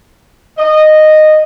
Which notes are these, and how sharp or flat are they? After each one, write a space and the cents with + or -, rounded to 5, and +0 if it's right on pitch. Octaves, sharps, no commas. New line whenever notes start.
D#5 -10